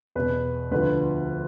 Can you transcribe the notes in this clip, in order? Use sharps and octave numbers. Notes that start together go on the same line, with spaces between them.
E2 B2 B4
D2 D3 F3 B4